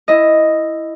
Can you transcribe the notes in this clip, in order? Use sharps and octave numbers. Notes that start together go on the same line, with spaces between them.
E4 D#5